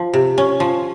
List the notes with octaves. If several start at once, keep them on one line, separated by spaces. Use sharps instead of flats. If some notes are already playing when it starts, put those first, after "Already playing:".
Already playing: F3
C3
C#4
F3